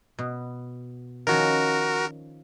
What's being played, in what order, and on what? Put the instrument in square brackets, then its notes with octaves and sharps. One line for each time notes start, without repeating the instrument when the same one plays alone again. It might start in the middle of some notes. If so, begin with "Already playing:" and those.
[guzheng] B2
[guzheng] D#3 F3 C#4 [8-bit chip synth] F#4 A#4